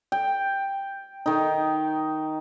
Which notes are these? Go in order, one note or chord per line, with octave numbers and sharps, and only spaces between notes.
G5
D#3 D#4